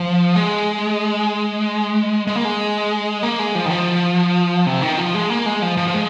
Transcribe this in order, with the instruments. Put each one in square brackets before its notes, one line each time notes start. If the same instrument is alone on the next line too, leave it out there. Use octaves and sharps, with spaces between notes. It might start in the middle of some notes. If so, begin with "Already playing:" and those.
Already playing: [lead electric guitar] F3
G#3
G#3
A#3
G#3
A#3
G#3
F3
D#3
F3
C3
D#3
F3
G#3
A#3
G#3
F3
F3
F3
G#3